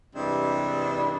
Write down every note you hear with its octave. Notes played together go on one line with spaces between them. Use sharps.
G2 C3 E3 G3 G#3 D4